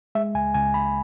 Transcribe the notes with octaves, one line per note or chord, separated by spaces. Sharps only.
G#3 E5
C#2 G#5
C#2 G#5
C#3 B5